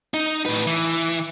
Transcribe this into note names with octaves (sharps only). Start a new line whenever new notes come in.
D#4
A2 B4
E3